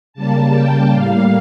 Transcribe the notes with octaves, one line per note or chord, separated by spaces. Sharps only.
C#3 G3 A#3 A5
G5
A2 G3 A#3 F5